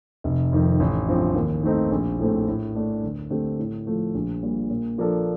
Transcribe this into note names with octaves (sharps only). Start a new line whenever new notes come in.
F1
F2 D#3
A1
G2 F3 C4
D#2
D#3 A3 C4 D#4
A#1
A2 A3 C4
A2
A3 D4
D2
D3 A3 C4 G4
A2
F3 A3
A#1
A#2 G3
A#2
F3 A#3 D4 A4